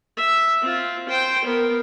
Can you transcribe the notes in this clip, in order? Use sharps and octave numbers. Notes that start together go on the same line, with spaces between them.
E5
C4 F4
C5 G5
B3 A#4